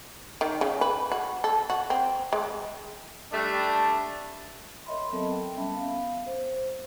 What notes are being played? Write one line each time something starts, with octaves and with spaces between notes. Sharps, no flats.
D#3
C#3
B4
F#4
A4
F#4
C4
G#3
G3 A3 D4
A#4 C#5 D#5 E5 B5 C6
F#3 B3 C4 A4 A#4 A5
G5
G3 B3 C#4 E5 A5 B5
B3 F5
C5